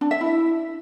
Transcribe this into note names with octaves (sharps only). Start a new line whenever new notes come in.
D4
E5
E4